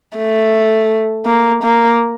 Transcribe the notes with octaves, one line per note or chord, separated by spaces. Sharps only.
A3
A#3
A#3